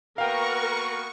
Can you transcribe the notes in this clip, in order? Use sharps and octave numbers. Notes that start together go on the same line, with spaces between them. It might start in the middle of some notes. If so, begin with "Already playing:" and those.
A#3 B3 F#4 A#4 F5 G5 C#6